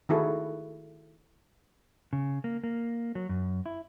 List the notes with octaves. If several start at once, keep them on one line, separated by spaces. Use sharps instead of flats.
D#3 A3 E4 F#4 G#4 A4
C#3
A#3
A#3
F#3
F#2
E4